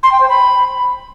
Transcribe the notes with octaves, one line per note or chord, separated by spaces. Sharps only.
C6
G5
C5
B5